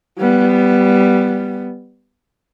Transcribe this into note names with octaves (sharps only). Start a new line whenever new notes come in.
G3 B3